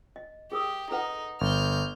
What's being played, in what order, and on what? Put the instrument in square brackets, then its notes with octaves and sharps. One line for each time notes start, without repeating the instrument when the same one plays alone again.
[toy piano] D#5
[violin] G4 [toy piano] G#4 A#4 D#6
[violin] D#4 [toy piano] A4 B4 F#5
[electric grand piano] G1 [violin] F6 G6